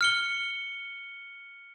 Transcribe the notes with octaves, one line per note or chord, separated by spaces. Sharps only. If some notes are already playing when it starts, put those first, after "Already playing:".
F6 C#7 G7